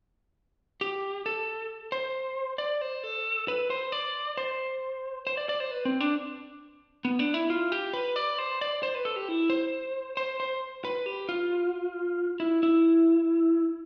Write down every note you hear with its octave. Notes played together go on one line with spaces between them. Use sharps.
G4
A4
C5
D5
C5
A4
B4
C5
D5
C5
C5
D5
D5
C5
B4
C4
D4
B3
D4
E4
F4
G4
B4
D5
C5
D5
C5
B4
A4
G4
E4
C5
C5
C5
B4
G4
F4
E4
E4